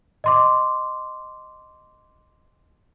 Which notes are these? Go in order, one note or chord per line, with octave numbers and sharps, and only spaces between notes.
D#5 C6 D6